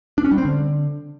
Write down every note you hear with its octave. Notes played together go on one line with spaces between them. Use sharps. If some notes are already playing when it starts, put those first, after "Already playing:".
D4
C#4
G3
C4
D3